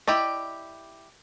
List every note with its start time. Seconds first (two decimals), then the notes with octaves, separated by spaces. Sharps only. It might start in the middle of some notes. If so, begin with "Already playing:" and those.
0.07 E4 G4 D5 D#5